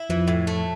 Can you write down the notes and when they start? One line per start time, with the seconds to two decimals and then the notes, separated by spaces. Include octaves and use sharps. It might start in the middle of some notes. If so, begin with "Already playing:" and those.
Already playing: E4
0.10 F2 E3 F3
0.28 A2
0.47 A3